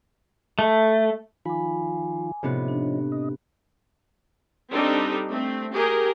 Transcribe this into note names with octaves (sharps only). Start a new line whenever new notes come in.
A3
D#3 F3 F4 G#5 B5 D6
A2 C3 F3 B3 C#4 D#4
D4
D#5
G3 C4 D4 D#4 G4 A4
A3 C4
G4 G#4 A#4